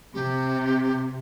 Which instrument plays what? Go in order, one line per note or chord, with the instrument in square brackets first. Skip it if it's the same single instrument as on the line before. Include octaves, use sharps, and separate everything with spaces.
[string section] C3 [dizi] G4